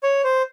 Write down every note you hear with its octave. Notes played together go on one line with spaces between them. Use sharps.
C#5
C5